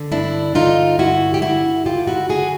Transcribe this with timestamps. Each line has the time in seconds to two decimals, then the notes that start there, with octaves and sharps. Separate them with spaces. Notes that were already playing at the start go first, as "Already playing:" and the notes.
Already playing: D3
0.12 G2 D4 E4
0.55 D3 D#4 F4
0.99 G2 E4 F#4
1.34 G4
1.42 G2 E4 F#4
1.85 D3 F4 G4
2.07 E4 F#4
2.29 D3 F#4 G#4